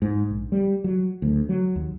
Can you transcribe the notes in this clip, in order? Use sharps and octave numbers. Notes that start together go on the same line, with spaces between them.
G#2
A#1
G3
F#3
D2
F#3
D#2